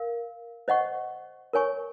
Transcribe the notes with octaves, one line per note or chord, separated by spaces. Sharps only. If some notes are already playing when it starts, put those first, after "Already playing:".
Already playing: A#4 F5
C5 D#5 F#5 C#6
A#4 C#5 G#5 C#6